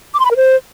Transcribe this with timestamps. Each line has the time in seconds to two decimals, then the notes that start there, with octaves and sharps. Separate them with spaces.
0.14 D6
0.20 C6
0.25 B5
0.31 A#4
0.37 C5